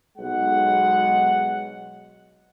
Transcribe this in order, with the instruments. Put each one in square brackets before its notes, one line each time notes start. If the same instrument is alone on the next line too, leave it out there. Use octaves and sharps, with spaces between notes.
[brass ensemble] B1 G#3 F#5